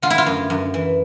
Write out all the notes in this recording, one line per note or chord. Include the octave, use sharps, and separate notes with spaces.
D3 F4
E4
F4
F#2
F#2
E3